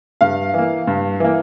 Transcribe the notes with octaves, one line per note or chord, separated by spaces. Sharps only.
G2 F5
E3 A#3
G2
E3 A#3